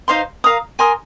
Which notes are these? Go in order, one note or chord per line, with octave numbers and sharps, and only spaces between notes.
D#4 C5 F5 C6
A#4 F5 A#5 D#6
A#4 G#5 C6 D#6